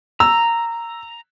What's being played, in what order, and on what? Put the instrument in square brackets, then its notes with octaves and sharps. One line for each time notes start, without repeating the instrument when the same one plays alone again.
[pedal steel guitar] A#5 [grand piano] E6